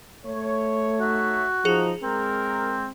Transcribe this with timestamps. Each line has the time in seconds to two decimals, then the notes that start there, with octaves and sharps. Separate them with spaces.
0.26 A3 C#5
1.00 D#4 F#4 C#5 E5
1.65 F3 D#4 G#4 F7
2.03 G#3 C4 A#4